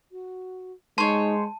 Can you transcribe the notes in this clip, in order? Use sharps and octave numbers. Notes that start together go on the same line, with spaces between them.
F#4
G#3 D#4 C5 C#5 A5